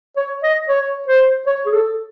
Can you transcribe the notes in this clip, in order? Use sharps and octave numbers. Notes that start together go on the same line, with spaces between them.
C#5
D#5
C#5
C5
C#5
G#4
A4